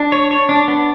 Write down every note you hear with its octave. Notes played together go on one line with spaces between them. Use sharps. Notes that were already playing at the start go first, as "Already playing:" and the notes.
Already playing: D4
C#5
C#5
D4
B3